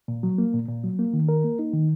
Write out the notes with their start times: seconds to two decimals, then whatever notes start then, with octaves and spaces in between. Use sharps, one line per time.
0.08 A#2
0.23 F#3
0.38 A#3
0.53 A#2
0.68 A#2
0.84 F#3
0.99 A#3
1.14 D#3
1.29 A#4
1.44 A#3
1.59 D#4
1.74 D#3